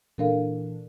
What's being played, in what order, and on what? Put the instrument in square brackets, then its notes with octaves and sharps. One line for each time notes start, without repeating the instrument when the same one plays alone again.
[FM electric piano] A#2 E3 D4 [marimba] A4 A#4 F5